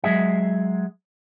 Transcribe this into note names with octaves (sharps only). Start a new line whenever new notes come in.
F#3 G#3 G#4 E5